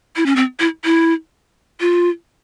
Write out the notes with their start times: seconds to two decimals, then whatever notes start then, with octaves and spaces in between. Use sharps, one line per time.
0.16 E4
0.26 C#4
0.36 C4
0.60 E4
0.84 E4
1.80 F4